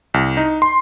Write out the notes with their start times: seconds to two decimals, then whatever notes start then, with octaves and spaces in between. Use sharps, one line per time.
0.14 C2
0.37 D#4
0.62 C6